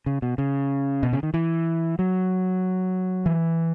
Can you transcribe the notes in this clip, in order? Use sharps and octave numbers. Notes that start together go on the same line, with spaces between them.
C#3
B2
C#3
B2
C#3
D#3
E3
F#3
E3